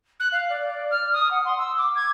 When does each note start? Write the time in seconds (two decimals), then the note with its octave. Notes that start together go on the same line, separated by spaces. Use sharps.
0.20 F#6
0.32 F5
0.50 D5
0.68 D5
0.91 F6
1.13 D#6
1.31 F#5
1.45 C6
1.58 E6
1.78 D6
1.96 G#6